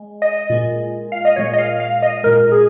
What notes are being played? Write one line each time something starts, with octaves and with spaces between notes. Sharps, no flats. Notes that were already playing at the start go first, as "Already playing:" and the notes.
Already playing: G#3
D#5
A#2 G#3
F5
D#5
A#2 G#3 C#5
D#5
F5
F5
D#5
A#2 G#3 A#4
G#4